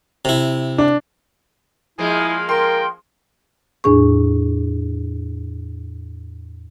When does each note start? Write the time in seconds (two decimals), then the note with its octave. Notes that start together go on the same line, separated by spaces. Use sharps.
0.25 C3 E4
0.78 D4
1.99 F3 G#3 A#3 E4 G#4
2.49 A#4 G5 C6
3.84 E2 A2 D4 G#4 C#6